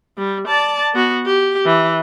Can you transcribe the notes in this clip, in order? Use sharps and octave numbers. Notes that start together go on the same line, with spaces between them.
G3
D5 A5
B3 F#4
G4
E3